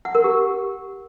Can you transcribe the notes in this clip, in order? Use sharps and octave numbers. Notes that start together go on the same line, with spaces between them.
F#5
A#4
G4